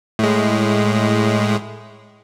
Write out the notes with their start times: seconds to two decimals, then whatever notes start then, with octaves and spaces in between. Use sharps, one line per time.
0.19 A2 G#3